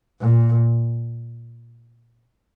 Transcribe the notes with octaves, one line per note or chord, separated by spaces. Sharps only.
A#2